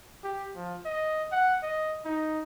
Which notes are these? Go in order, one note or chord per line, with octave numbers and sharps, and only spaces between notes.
G4
F3
D#5
F#5
D#5
D#4